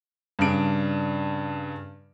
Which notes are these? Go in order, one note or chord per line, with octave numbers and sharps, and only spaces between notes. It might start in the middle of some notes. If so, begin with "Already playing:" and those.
G2 C#3 D4 D7